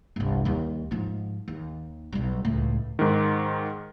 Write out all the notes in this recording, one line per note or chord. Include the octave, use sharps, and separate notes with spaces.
G1 C2
D#2 G3
G#2 F3
D#2
B1 G3
C#2 A2
G#2 D#3